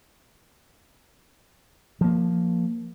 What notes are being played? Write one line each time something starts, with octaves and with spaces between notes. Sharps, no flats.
F3 A#3